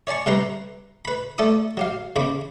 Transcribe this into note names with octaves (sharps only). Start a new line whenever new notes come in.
C#5 D5 G#5 A5 C#6
C3 G3 G4 B4 A#5 C6
B4 B5
A3 A4 D5 D6 D#6
F#3 G4 F5
E2 C#3 B5 D6